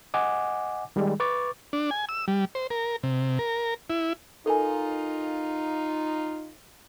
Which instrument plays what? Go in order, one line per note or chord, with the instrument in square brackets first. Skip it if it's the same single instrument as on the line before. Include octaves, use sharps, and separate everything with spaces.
[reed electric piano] D#5 F#5 G#5 D6
D#3 G3 G#3
B4 C#6 D6 A6
[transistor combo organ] D4
G#5
E6
G3
C5
A#4
C3
A#4
E4
[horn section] D#4 F4 [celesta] A4 A#4 G#5